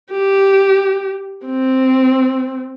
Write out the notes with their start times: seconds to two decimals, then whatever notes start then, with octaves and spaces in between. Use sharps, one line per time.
0.11 G4
1.45 C4